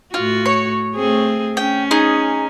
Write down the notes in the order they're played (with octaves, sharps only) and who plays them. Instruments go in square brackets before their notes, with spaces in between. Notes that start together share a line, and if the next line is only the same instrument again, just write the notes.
[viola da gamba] A2 F#4 [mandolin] F4
[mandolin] C#5
[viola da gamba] A3 C4 G#4
[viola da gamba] C#4 [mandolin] G5
[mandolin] D#4 G#4